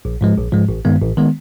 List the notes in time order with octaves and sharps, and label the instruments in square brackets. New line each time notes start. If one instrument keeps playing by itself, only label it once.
[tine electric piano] A#1
G#2 F3 G#3
A#1
G#2 F3 G#3
A1
G2 D#3 G#3 B3
A1
D#3 G#3 B3